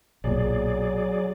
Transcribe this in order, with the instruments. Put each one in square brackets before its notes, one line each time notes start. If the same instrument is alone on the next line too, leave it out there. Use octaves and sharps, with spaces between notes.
[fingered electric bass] B1 A#2 [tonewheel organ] F#3 G#4 D5